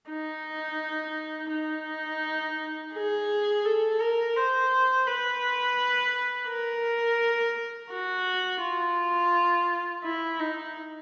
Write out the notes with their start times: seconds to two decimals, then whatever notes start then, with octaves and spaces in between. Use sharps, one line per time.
0.10 D#4
1.52 D#4
2.94 G#4
3.65 A4
4.01 A#4
4.36 C5
5.07 B4
6.49 A#4
7.91 F#4
8.62 F4
10.04 E4
10.39 D#4